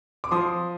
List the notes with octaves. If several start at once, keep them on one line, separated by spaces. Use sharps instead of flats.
D6
F3 C6 D#6